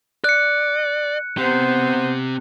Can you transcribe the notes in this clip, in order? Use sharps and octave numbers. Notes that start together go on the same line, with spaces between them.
D5 F#6 C#7
B3 C4 G4 C5